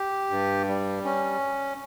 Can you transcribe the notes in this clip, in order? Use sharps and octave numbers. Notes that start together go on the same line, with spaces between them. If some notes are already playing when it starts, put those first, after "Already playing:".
Already playing: G4
G2
G3
C#4